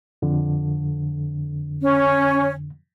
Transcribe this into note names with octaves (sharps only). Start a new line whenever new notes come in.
F2 D3
C#4